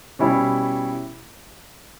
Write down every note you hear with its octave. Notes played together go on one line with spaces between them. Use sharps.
B2 G3 C#4 E4